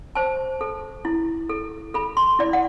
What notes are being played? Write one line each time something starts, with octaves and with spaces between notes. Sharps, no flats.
C5 A5
A4
E4
A4
A4 B5
C6
E4 D5
F#5